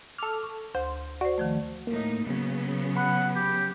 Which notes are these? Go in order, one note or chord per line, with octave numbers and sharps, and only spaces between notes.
A4 D6 F6
C#6
D2 C5
F#4 C5 D5
D#3 F3 A3
A2 A#3 D#4
C#3 F#3 B3
F#5 B5
G4